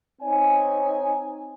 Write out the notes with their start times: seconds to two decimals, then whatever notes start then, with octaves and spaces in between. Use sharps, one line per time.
0.21 C4 D#4 C#5 G#5